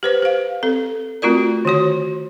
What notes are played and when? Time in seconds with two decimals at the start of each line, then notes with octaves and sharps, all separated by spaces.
0.03 G4 B4 C5
0.22 G4 F5
0.63 C4 A4
1.22 A3 C4 F4 F#4 A#4 D5
1.65 D3 D#3 F#4 C#5